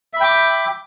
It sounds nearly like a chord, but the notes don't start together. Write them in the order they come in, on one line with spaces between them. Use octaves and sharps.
E5 B5 G5 D6